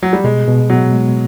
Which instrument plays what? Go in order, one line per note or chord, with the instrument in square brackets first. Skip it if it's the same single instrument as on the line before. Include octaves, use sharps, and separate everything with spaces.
[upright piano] F#3
G3
[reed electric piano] B2 [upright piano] G#3
[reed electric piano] B2
[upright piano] F#3 [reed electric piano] B3
[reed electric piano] G#3